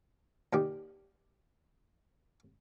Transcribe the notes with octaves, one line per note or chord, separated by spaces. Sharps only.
A#2 D#3 G4